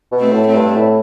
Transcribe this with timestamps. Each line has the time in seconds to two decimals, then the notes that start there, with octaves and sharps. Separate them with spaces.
0.12 B2
0.19 A3 C4
0.33 A2
0.47 A3 C4
0.54 G2
0.75 A2